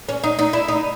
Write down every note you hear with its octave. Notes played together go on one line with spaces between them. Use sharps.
C#4
D#4
D#4
E4
D#4